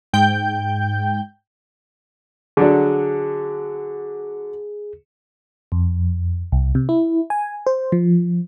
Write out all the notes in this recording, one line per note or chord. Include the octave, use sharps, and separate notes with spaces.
G#2 G5 G6
D3 F#3 D4 G#4
F2
C2
C3
E4
G#5
C5
F3